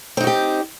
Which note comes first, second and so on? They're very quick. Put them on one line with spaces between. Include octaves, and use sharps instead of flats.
C4 D#4 F#4 G4